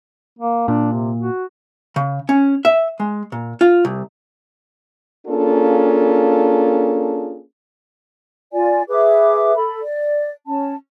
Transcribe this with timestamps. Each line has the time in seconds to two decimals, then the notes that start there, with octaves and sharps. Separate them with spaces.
0.39 A#3
0.68 A#2 D4
0.92 C3
1.18 F#4
1.96 C#3
2.29 C#4
2.65 E5
3.00 G#3
3.32 A#2
3.61 F4
3.85 C2
5.27 A#3 C#4 D4 F4 G#4 A4
8.52 F4 D5 G#5
8.89 G#4 B4 E5 D6
9.56 A4 B5
9.81 D5
10.47 C#4 A5